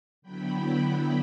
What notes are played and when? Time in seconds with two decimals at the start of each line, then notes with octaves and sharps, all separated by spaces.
0.22 D3 F#3 B3 E4 G5 B5